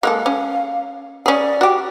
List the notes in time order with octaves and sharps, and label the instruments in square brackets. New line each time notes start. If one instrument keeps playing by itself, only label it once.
[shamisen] G#3 A#3 A4 [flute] F5
[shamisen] C#4
[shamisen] C#4 G#4 [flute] D5
[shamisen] F#4 G4